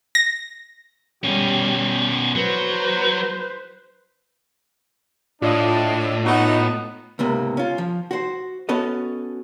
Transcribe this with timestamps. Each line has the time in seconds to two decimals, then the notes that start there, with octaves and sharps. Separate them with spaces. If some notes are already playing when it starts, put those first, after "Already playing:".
0.15 A#6
1.24 B2 G3 C#4
2.35 F#3 B4 C5
5.42 A2 D4 F4 D#5
6.25 B3 D#4 F#4
7.19 C#2 G#2 C3 A#3 B3
7.57 C#4 F4
7.78 F3
8.11 F#4 C5
8.69 B3 C#4 F#4 A4 D#5